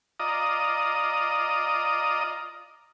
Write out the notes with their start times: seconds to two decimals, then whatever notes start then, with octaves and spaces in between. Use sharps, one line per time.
0.20 F4 D5 D#5 A#5 D#6